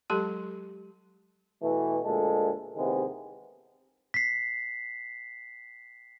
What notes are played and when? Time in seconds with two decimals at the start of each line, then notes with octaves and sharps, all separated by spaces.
0.10 F#3 G#3 G4 A4 A5 C6
1.63 B2 E3 A3
2.05 D2 A#2 G#3 A4
2.77 D#2 C3 D#3 E3 G#3 B3
4.14 B6 C7